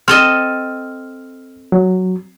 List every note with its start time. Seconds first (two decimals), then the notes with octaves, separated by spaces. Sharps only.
0.08 C4 A4 D#5 F6
1.72 F#3